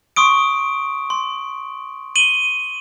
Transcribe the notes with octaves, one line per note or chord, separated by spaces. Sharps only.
C6 C#6 D#6 D7
C6
D#7 F#7 G7